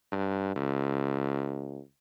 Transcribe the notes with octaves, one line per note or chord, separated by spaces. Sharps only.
G2
C#2